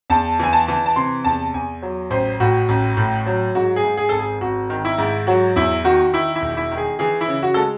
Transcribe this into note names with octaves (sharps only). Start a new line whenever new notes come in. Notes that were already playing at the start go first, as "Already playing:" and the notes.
E2 A5
E3 G#5
A5
E3
A5
C3 C6
E2 A5
E2 G#5
F#3
A1 C5
A2 F#4
A1
A2
F#3
G#2 F#4
G#4
G#2
G#4
G#1 A4
G#4
G#1 F#4
D#3
E4
G#2
F#3 F#4
E2 E4
D#3 F#4
D#3 E4
E4
E1
E4
D#3
G#4
E3 G#4
E4
C#3
F#4
G#3 A4